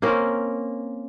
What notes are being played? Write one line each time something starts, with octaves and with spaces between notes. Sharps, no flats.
A#3 C4 C#4 A#4